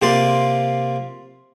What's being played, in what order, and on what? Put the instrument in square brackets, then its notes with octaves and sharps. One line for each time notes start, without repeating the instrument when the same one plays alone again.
[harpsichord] C3 A#3 F4 D5 C6